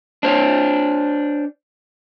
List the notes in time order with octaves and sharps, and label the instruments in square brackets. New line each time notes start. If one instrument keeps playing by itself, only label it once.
[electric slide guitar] D4 C5 C#5